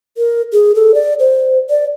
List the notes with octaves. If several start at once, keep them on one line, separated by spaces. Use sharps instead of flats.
A#4
G#4
A4
D5
C5
D5